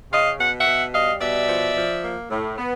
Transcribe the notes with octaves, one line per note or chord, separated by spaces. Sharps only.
C#3 D#5 F5
B2 F#5
E5 F#5
B2
G3 D#5 F5
B2 D5 E5
F3
F3
A#3
A2
B3